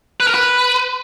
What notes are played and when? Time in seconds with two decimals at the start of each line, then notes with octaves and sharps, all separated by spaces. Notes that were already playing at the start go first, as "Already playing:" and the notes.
0.20 B4
0.27 A#4
0.34 B4